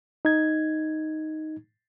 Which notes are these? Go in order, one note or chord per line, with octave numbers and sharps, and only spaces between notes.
D#4 G#6